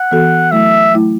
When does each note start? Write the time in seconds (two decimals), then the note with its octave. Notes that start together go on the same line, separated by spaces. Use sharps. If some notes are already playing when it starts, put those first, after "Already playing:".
Already playing: F#5
0.11 E3 B3 F#4 A4
0.51 F#3 A3 E4 E5
0.92 F#3 A3 E4